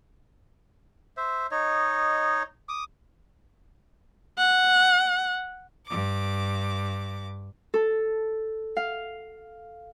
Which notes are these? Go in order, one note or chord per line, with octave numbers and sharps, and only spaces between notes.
C5 E5
D#4 C#5 D#5
D6 D#6
F#5
G2 D6
A4
F5